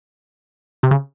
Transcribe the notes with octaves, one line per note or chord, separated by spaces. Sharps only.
C3
C#3